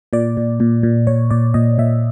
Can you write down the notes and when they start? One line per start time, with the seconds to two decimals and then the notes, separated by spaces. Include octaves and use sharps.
0.13 A#2 D5
0.37 A#2
0.60 A#2
0.83 A#2
1.07 A#2 C#5
1.30 A#2 D5
1.54 A#2 D#5
1.78 A#2 E5